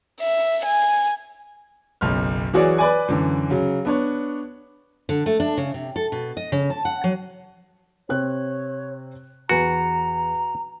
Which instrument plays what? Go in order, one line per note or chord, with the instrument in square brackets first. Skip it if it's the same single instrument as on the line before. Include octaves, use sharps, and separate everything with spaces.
[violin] E5
G#5
[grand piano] F#1 B1 F6
E3 F#3 F#4 G#4 C#5 D5
B4 D5 G#5
F#2 D3 E3
C#3 F#3
B3 D4 C#5
[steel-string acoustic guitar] D3
A3
D4
C#3
C3
A4
B2
D#5
C#3
A5
F#5
F#3
[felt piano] C3 C4 F#6 [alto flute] C#5
[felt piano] E2 B4 G#5 [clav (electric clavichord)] F#4 [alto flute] A#5